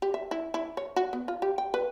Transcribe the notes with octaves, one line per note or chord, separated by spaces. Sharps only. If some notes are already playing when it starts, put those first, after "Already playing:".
G4
E5
E4
E4
C#5
F#4
B3
F4
G4
G5
B4